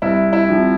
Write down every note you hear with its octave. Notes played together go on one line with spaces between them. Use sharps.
C2 E4
E4
C3 F3